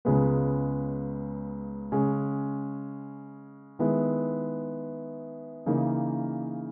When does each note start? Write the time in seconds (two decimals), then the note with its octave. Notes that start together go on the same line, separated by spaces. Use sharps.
0.05 C#2 C#3 G#3 B3
1.92 C#3 G#3 C#4
3.79 D#3 G#3 B3 E4
5.66 C#3 E3 A#3 D#4